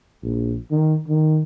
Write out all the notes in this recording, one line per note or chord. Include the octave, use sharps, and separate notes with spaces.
A#1
D#3
D#3